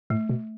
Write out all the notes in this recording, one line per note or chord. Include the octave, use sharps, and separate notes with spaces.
A2 A3
B2